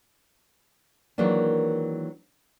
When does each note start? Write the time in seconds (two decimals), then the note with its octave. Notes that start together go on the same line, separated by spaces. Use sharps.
1.18 D#3 E3 F#3 G#3 A#3 D4